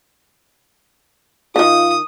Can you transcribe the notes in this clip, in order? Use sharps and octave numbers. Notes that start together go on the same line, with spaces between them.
D3 D#3 F4 D#6